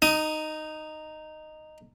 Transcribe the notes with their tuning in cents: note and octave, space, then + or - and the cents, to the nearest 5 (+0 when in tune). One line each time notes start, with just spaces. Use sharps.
D#4 -10 D#6 +15